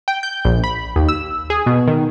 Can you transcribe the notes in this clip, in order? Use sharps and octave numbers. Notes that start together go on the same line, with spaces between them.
G5
G6
A#1
B5
D#2
E6
G#4
B2
D#3